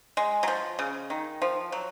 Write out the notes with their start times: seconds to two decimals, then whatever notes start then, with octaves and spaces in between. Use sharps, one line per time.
0.17 G#3
0.43 F#3
0.48 F3
0.79 C#3
1.10 D#3
1.42 F3
1.72 F#3